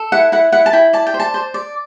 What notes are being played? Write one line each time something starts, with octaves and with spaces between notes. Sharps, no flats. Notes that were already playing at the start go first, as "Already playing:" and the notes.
Already playing: A4
E4 F#5
E4 F#5
E4 F#5
A5
E4 G5
D5 A5
G5
C5
A5
C5
D5